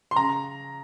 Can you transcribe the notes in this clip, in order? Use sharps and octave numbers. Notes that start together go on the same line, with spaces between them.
C6
C#3 A#5